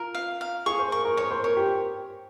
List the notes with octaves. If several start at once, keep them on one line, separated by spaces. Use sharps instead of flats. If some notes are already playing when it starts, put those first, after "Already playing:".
Already playing: F4 A#4
F5
F5
G#4 C#6
C5
A#4 C#6
A#4
A#4 C#5
C5
A#4 C#5
G4